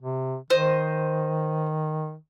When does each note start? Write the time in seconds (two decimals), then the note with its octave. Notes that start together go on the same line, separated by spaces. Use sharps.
0.02 C3
0.50 D#3 C5 D#5